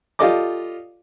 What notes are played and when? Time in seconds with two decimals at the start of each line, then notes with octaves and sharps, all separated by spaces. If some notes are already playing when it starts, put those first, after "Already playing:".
0.19 F4 G4 A4 D5 D#5 D6